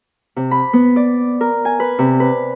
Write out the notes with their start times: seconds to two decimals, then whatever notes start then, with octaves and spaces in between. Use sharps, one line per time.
0.36 C3
0.51 B5
0.73 B3
0.96 D5
1.41 A#4
1.65 G#5
1.80 B4
1.99 C3
2.20 B4